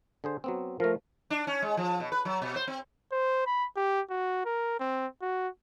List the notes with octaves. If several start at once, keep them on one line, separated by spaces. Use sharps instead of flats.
D3 G#4 C5
F#3 B3 C4
F3 A3 A#4
D4
C#4
G#3
F3
B2
B4
F#3
B2
C5
C4
C5
B5
G4
F#4
A#4
C4
F#4